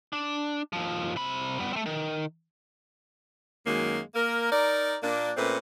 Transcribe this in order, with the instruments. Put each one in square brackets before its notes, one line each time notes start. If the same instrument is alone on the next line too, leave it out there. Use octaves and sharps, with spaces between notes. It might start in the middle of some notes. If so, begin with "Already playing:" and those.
[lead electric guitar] D4
D#2 F3
C3 B5
G3 B3
A3 C4
D#3
[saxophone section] F#2 D#3 F#3 G#3 A#3
A#3 A#4
D#4 A#4 D5
A#2 A#3 D4
A#2 A3 C4 C#4 B4